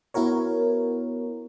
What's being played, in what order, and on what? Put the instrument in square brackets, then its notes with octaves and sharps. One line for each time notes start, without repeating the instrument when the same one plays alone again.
[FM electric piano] B3 E4 F#4 A#4 C#5